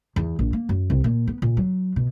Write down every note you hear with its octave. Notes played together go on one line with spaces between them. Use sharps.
E2
A#1
A#3
F#2
C2
A#2
B3
A#2
F#3
B2